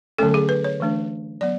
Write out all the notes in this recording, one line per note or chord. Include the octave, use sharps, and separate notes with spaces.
D3 F#3 A3 C#4 A4
G#4
B4
C#5
E3 A3 D4
F#3 B3 D5